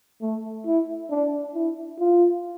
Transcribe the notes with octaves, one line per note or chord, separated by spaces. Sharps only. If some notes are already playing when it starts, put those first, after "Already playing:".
A3
E4
D4
E4
F4